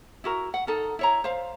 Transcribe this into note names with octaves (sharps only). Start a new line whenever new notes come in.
E4 F#4 A#4
F#5
D#4 A4 A#4
E4 C#5 A#5
C5 F5